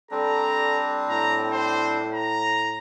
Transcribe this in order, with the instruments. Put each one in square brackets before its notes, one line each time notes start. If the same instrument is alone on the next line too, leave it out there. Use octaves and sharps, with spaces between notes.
[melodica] G3 C4 D4 [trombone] A4 [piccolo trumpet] A#5
[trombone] A2 [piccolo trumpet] A#5
[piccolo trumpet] C5
A#5